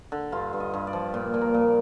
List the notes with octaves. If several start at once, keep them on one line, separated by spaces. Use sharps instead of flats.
D3
G2 F4
G2
D#5
G2
D5
F3
A#2
A#2
A#4
A#2